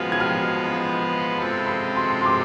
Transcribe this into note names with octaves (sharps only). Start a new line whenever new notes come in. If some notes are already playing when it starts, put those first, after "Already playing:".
Already playing: F3 G#3 B3 F4 B4 F6
G#6
F6
C3 G#3 C4 F4 A4 B5
B5
C6
C6
D6